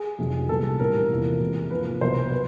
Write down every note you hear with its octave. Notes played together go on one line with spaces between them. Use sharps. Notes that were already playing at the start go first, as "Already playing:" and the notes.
Already playing: G#4
F2 C3 D#3 F#3
C2 A#2 G3 B3 A4
A2 E3 G3 C4 A#4
E2 C3 F3 A#3
E2 C3 E3 G#3
G#2 F3 A#3 B4
C2 B2 F#3 B3 C5
B4